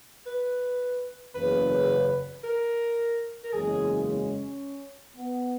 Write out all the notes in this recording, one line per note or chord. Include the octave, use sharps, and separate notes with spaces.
B4
F#1 E2 C#3 B4
A#4
A#4
F#1 E2 C#3 G#3 G#4
C#4
B3